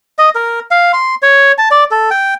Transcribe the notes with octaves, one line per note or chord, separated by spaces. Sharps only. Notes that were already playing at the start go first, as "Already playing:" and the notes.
D#5
A#4
F5
C6
C#5
A5
D5
A4
G5